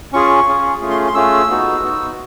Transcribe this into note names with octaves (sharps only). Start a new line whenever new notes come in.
C#4 F4 G#4 C#6
C#4 F4 G#4
A3 C#4 F4 G#4
C6
C6
A3 C#4 F4 G#4 E6
B3 D#4 F#4
B3 D#4 F#4